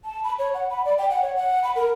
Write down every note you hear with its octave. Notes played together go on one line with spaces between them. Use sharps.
A5
B5
C#5
F#5
B5
D5
G5
F#5
C#5
F#5
B5
A#4